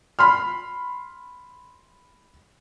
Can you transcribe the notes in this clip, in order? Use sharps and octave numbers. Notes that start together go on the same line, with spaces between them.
B5 C6 F6